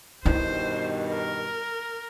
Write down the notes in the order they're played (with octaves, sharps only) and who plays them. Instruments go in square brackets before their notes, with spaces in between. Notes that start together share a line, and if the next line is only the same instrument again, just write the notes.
[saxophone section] G2 B2 D#3 [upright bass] E4 [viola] C5
[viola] A#4